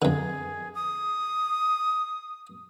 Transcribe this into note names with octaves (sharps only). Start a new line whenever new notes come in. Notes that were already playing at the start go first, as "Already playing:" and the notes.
F2 D3 G#4
D#6